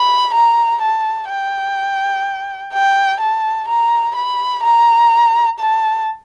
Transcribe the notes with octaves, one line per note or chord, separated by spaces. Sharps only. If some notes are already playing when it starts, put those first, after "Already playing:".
Already playing: B5
A#5
A5
G5
G5
A5
A#5
B5
A#5
A5